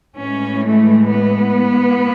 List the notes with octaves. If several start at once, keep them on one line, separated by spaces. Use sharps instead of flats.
A2 E3 G#3 C#4
A3
B3